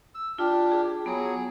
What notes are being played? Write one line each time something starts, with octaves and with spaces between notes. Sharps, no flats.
E6
D4 F4 G4
G#4
F#3 B3 G#4